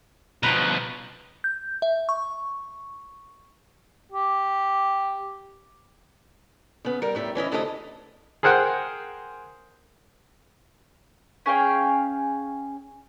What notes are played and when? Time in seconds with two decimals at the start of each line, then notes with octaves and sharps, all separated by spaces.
0.43 B2 F3 B4 A#5
1.44 G6
1.82 E5
2.09 C#6
4.12 G4
6.85 C#3 B3
7.02 G3 A#4
7.15 A2 G3 E5
7.35 E3 C#4 E4 D#5
7.52 D2 C3 E4 A4 A#4 D#5
8.43 G#4 A#4 C5 F#5 G5
11.46 C#4 G#4 F5 G5